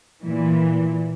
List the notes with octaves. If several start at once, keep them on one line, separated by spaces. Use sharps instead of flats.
A#2 E3